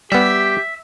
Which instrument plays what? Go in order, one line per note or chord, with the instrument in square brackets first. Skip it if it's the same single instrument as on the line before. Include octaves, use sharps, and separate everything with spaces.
[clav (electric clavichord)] G3 B3 [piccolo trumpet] G4 [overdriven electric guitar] E5